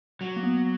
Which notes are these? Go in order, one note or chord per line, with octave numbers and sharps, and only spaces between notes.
F#3
A#3
B3